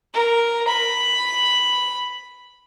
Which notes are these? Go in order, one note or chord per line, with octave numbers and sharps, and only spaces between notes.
A#4
B5